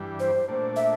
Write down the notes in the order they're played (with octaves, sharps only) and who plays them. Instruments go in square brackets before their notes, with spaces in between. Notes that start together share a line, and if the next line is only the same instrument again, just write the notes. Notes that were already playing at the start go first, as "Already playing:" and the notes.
Already playing: [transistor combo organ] G2 E3 G3 D4
[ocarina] C5
[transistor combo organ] A#2 A3 D4
[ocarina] E5